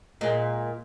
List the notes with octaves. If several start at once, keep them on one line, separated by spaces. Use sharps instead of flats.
A#2 G#3